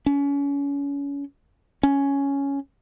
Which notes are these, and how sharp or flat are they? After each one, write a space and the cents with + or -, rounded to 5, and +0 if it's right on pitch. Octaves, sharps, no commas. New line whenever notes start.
C#4 +30
C#4 +5